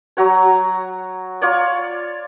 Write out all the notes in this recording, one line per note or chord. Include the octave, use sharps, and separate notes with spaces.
F#3 F#4 C#5
F4 C#5 D5